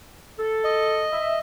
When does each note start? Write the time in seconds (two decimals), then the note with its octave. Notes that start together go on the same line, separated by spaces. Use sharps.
0.39 A4
0.64 D#5
1.11 E5